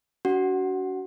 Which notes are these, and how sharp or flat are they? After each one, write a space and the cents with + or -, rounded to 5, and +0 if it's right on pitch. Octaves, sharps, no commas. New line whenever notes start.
D4 -45 F#4 +25 F#5 +0